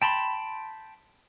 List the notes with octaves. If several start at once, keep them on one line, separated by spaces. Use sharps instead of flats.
G5 A5 B5 C6